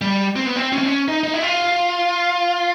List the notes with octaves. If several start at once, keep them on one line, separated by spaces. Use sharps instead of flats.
G3
C4
B3
C4
C#4
C4
C#4
D#4
D#4
E4
F4